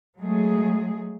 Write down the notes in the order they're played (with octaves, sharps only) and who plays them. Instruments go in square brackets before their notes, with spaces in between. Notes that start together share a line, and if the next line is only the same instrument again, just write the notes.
[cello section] F#3 G#3 A3 G#4